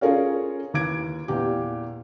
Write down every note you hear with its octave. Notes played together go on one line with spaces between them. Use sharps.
C#4 F4 G#4 A#4 C#5 F5
D#2 E3 D6 G#6 D7
E2 A#2 G4